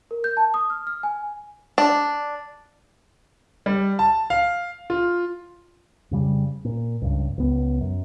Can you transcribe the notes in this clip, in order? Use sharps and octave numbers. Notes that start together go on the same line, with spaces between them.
A#4
G6
A5
D#6
F6
F6
G#5
D4
G3
A5
F5
F4
F2 C#3 G3
A#2
C#2 G2
C#2 B3
F#2